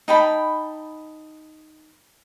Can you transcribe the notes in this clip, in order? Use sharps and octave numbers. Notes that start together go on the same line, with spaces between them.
D#4 G5 A5 B5